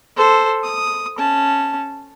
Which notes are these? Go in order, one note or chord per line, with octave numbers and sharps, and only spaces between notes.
A4 C5
D#6
C#4 A5